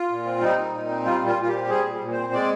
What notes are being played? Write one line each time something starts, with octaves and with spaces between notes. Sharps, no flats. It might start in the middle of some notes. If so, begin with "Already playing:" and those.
Already playing: F4
A#2
C4
G3 D#4
A#2
A#2
C4
G3 F4
A#2
F4
A#2
F4
G4
C4
G3 G#4
A#2
A#2
C4 C5
G#3 D5